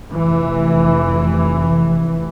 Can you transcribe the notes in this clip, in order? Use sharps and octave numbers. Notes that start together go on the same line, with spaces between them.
F1 E3